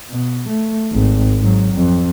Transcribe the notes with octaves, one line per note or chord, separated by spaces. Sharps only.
B2
A3
G#1
G#2 F#3
F2